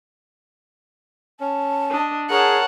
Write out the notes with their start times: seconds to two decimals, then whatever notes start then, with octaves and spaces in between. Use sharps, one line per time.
1.40 C#4 A5
1.90 D4 D#5
2.30 G#4 A#4 C#5 F#5 A5